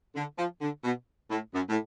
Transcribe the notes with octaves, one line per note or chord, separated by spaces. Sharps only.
D3
F3
D3
B2
A2
F#2
A2